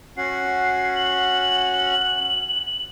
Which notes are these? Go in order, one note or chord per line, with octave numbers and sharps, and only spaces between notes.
C#4 F#4 F#5 C7
F#7